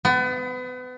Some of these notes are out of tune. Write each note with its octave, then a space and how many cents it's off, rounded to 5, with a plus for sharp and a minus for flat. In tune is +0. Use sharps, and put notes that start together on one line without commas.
B3 +35